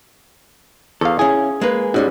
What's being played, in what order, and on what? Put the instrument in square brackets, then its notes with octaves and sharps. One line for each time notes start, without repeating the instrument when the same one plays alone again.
[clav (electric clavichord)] E2 F5 [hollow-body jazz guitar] A4
[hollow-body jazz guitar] C#4 E4 [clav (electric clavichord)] G#4
[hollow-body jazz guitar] G#3 A#3 B4
[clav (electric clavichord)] G#2 [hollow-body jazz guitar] G3 C#4 F#4